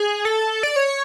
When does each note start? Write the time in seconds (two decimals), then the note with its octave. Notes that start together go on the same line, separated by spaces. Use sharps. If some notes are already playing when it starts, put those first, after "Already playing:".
Already playing: G#4
0.25 A4
0.63 D5
0.76 C#5